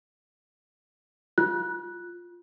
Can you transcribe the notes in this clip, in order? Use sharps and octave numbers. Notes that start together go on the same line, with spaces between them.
F4 F#6